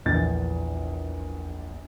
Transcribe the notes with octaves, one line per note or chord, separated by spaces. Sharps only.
A#1 E2 A6